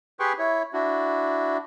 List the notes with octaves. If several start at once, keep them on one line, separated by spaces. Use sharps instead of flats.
G4 G#4 B4 G5 C6 C#6
E4 C#5
D4 E4 F#4